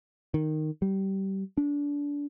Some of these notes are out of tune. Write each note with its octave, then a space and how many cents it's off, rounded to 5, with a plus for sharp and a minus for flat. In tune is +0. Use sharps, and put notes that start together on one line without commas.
D#3 -10
G3 -25
D4 -25